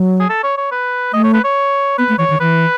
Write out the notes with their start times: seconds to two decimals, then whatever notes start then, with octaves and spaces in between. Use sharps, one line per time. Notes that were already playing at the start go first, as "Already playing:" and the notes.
Already playing: F#3
0.20 G#4
0.29 A4
0.43 C#5
0.57 C#5
0.71 B4
1.13 A3 D#5
1.24 C#5
1.34 B4
1.44 C#5
1.98 B3 B4
2.09 A3
2.18 E3 C#5
2.30 D#3
2.40 E3 B4